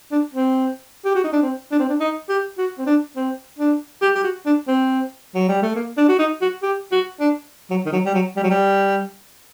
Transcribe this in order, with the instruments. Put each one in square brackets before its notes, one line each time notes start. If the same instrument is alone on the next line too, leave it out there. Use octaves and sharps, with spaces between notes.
[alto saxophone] D4
C4
G4
F#4
D#4
D4
C4
D4
C4
D4
D#4
G4
F#4
C4
D4
C4
D4
G4
G4
F#4
D4
C4
F#3
G3
A3
A#3
D4
F#4
D#4
F#4
G4
F#4
D4
F#3
D#3
F#3
G3
F#3
G3
F#3
G3